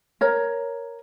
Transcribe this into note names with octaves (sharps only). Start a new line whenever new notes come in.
A#4 C#5 A#5